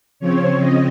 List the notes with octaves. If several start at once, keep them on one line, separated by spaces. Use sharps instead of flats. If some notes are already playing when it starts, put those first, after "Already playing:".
C#3 F3 C4 C#5
D#5